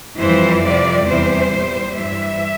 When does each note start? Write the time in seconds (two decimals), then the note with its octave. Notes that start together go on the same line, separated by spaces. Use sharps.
0.18 F2 E3 G3 C5
0.62 F2 C3 G3 D5
1.07 E2 C3 E3 G3 C5
1.51 A#2 G3
1.96 G2 E3 G3 E5